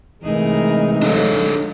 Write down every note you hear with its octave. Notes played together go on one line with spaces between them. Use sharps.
C3 E3 G#3 A3 D#4 G#4 A#4
F3 D4 A4 C#5